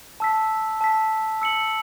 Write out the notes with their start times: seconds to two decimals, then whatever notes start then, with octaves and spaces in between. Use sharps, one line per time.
0.20 A5 E6 B6
0.81 A5 E6 B6
1.42 E6 C#7 F#7